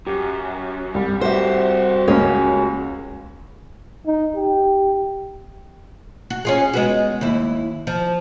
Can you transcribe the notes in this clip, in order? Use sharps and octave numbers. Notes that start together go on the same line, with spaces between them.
F#2 G4
C2 G3
F#4 G4 C5 E5
C#2 G#3 A#3 C#4
D#4
G4
F#4
C#4 F4 G#4
G#3 B3 F#4
D#2 E4
F3